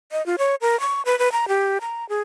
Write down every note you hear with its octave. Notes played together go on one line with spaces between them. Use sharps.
D#5
F4
C#5
A#4
C#6
B4
B4
A#5
G4
A#5
G#4